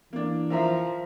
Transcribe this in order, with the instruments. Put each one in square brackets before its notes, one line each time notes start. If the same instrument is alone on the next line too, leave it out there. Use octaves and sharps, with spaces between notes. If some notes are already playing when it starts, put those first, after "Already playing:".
[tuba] E3 [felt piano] A#3 D4
[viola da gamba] F3 [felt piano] A#4 E5 A#5